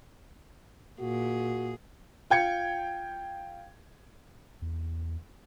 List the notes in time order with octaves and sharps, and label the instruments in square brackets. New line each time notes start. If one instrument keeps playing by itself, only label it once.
[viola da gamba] A#2 G#4 [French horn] F#4
[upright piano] F4 G5 G#6 C#7
[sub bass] E2